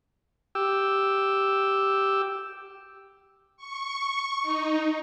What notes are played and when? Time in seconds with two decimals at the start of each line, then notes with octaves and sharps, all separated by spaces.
0.55 G4 E6
3.57 C#6
4.42 D#4